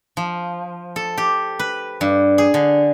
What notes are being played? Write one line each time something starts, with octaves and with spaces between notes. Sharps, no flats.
F3
A4
G4
B4
G2
G#4
D3